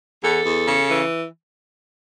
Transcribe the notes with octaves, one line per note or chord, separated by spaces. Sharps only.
E2 A4
E2
C#3
E3